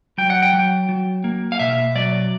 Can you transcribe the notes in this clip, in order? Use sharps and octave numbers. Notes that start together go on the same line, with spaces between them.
F#3 G5
F#5
G5
F#3
F#3
A#3
F5
B2 E5
F#3 D5